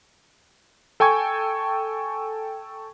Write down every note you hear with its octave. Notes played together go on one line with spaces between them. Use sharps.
A4 G5 G#5 C#6 G#6